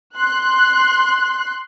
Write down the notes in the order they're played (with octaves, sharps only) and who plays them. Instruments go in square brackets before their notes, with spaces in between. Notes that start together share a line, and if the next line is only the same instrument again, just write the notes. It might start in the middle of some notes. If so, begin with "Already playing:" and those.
[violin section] C6 F#6